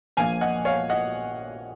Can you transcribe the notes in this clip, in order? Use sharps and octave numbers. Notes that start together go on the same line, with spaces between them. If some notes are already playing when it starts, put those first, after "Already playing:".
A#1 A#2 F3 F5 G#5
D#5 F#5
C#5 F5
D#5 F#5